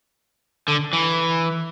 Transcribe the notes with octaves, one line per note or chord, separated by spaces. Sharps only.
D3
E3